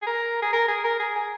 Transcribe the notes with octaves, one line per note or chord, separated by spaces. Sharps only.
G#4
A#4
G#4
A#4
G#4
A#4
G#4
G#4